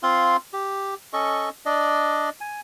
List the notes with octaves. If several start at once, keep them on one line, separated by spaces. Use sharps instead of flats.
C4 F4 F5 C6
G4
C#4 A4 D#5 C#6
D4 D5 D#5
G#5